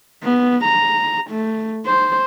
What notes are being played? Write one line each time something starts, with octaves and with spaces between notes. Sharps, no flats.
B3
A#5
A3
C5